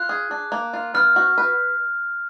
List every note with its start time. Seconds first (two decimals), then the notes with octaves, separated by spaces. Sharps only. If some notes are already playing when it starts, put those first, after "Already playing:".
Already playing: F4 F#6
0.09 G#4
0.31 D4
0.52 A#3
0.73 F4
0.94 B3 F6
1.16 F#4
1.38 B4